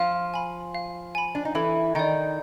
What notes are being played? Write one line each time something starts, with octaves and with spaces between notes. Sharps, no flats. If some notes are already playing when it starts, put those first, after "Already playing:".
Already playing: F3 F4 F5
G#5 B5
F5
G#5 B5
D4
D#4
E3 E4 A4
D#3 D#4 D5 G5